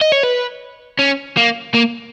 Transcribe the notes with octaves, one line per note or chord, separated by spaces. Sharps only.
D#5
C#5
B4
C#4
A#3
A#3